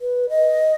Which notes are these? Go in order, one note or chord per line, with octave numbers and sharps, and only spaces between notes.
B4
D#5